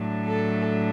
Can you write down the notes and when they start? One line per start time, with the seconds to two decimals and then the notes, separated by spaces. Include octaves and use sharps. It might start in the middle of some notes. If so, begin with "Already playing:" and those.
Already playing: A2 F#3 A3 D4
0.27 A4